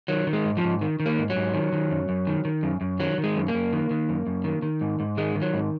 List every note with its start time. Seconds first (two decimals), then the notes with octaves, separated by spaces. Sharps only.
0.08 D#3 F#3
0.27 D#3
0.33 G#3
0.44 G#2
0.57 F3
0.64 G#2
0.81 D#3
1.00 D#3
1.06 A#3
1.18 G#2
1.30 F#3
1.36 G#2
1.54 D#3
1.73 D#3
1.91 F#2
2.09 F#2
2.27 D#3
2.45 D#3
2.63 F#2
2.81 F#2
2.99 D#3 F#3
3.18 D#3
3.24 G#3
3.36 F#2
3.48 A#3
3.54 F#2
3.73 D#3
3.91 D#3
4.09 F#2
4.27 F#2
4.44 D#3
4.62 D#3
4.81 G#2
5.00 G#2
5.17 D#3 G#3
5.36 D#3
5.42 F#3
5.54 G#2